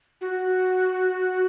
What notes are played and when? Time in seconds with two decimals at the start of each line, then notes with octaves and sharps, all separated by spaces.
0.21 F#4